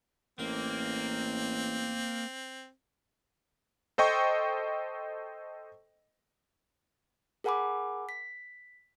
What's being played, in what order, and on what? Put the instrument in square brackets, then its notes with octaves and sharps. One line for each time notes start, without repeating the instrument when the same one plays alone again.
[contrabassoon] A1 [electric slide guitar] A#3 [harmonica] C4
[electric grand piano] A4 C5 D#5 G5 C#6
[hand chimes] G#4 A#4 F#5 G#5 B5 D6
B6